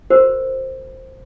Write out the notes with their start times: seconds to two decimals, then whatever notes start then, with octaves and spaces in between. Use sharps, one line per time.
0.10 F#4 A#4 C5